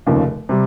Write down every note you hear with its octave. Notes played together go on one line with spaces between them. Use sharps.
F1 D#2 C#3 F3
C3 G3